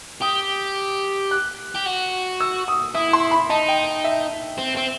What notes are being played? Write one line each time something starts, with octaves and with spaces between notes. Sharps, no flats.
G4 D#6
F#6
G4
F#4
E6
D#6
E4 D#6
C6
B5
D#4 A5
G5
E5
C4
C4